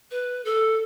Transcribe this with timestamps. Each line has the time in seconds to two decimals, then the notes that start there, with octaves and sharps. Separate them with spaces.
0.11 B4
0.45 A4